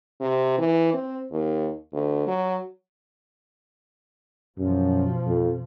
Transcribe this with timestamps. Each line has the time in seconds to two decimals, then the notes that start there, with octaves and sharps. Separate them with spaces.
0.21 C3
0.58 E3
0.93 C4
1.31 D#2
1.93 D2
2.27 F#3
4.58 F#2 B2 F3
5.26 F2